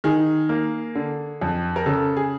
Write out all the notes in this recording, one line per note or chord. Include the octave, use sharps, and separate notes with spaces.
D#3 G#4
A#3
D3
F2
A#4
C#3 A4
G#4